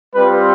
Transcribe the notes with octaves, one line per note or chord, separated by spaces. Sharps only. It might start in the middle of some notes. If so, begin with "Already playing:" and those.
G3 C4 F4 B4